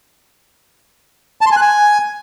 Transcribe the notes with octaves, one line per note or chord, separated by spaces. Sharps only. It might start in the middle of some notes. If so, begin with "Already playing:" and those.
A5
C6
G#5
F#6
G#5